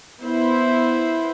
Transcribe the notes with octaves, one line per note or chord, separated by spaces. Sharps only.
B3 E4 C5